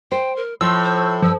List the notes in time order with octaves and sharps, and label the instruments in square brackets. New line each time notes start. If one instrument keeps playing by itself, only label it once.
[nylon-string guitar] C5 [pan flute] G5
[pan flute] A#4
[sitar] A2 [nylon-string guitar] F3 [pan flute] C6 [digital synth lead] E6
[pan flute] C5
[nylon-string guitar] G2 [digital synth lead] F3 [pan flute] E6